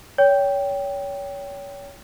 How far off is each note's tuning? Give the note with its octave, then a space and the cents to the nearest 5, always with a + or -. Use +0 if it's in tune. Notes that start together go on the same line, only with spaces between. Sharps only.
C#5 +30 G5 +0